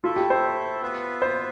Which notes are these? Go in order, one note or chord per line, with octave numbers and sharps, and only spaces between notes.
A3 E4 F4 A4 E5
G4
C5
B3 F4 B4 E5
C5